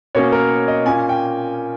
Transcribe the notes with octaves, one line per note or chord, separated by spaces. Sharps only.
B2 A#3 C#4 C#5
A#4
D#5
A#2 A#3 C#4 G#5
G5